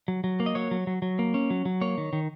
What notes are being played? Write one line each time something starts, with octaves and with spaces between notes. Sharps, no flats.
F#3
F#3
A#3
D#5
F#3 C#5
F#3
F#3
F#3
A#3
C#4
F#3
F#3
A#3 C#5
D#3
D#3